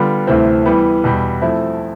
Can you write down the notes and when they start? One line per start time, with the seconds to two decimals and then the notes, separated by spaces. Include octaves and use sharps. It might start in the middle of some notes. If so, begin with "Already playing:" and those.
Already playing: D3 G3 B3 F4
0.27 D2 C3 E3 A3 C4
0.66 E3 G3 B3
1.04 E2 B2 G3
1.42 F3 A3 C4 E4